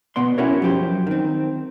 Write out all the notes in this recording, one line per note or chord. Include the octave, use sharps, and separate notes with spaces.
B2 B3 D5 C6
C#4 E4 F#4 A#4 C#5
F#2 F3 G4 C5
D#3 C4